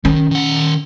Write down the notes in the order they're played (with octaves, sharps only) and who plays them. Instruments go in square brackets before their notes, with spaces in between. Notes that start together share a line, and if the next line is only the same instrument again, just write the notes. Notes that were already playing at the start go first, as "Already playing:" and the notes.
[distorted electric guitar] D#3 [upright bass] C#4
[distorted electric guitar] D#3 F#5